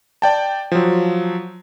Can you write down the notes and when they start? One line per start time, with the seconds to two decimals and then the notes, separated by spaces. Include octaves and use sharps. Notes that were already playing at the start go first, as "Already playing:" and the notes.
0.22 D5 G5 A5
0.72 F3 F#3